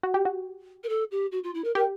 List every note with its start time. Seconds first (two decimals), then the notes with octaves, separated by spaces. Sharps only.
0.03 F#4
0.14 G4
0.25 F#4
0.83 A#4
0.89 A4
1.11 G4
1.31 F#4
1.43 F4
1.54 E4
1.64 A#4
1.75 G4 A#4